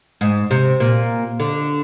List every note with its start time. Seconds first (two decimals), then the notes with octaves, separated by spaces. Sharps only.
0.21 G#2
0.51 C3
0.80 A#2
1.40 D3